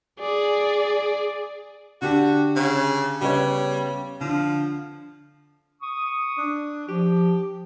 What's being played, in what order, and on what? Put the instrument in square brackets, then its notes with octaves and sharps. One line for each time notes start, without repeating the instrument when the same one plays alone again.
[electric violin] G#4 D5
[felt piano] D3 D4 G4 [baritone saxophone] F#4
[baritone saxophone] C#3
[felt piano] C#3 B3 C#5 [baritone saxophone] G3
[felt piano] D3 [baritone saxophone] F3
[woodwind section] C#6 D#6
[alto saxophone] D4
[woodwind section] F3 [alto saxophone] G4